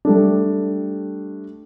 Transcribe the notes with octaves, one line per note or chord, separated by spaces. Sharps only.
G3 A3 D4